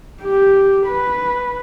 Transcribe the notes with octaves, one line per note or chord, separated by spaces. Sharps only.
G4
B4